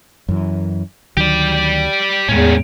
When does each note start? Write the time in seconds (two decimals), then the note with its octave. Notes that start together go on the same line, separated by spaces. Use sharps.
0.29 F#2 E3
1.17 D2 D#3 F#3 G4 D5
2.29 E2 A2 D#3 G#3 C#4